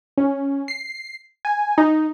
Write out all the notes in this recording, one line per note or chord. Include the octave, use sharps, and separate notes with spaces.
C#4
C7
G#5
D#4